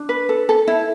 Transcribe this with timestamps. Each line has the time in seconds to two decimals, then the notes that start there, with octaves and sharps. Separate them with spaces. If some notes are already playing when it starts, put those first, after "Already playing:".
Already playing: D4
0.09 B4
0.29 A4
0.49 A4
0.67 E4